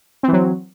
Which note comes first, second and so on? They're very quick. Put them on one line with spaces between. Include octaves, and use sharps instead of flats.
C4 E3 F#3